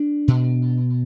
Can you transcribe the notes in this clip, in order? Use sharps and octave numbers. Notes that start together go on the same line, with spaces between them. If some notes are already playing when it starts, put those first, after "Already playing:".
Already playing: D4
B2